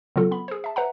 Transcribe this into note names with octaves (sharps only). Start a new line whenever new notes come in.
C#3 F#3 B3 F4 A4
B3 B5
G#4 C5
E5 A5
B4 E5 F#5 A#5